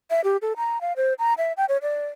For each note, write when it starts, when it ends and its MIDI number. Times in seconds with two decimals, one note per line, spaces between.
0.10 0.21 76
0.24 0.37 67
0.42 0.53 69
0.57 0.81 82
0.81 0.93 77
0.97 1.14 72
1.19 1.34 82
1.38 1.53 76
1.57 1.65 79
1.69 1.77 73
1.82 2.07 74